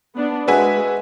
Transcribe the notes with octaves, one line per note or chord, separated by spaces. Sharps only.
B3 D4
G#3 F#4 B4 E5 G#5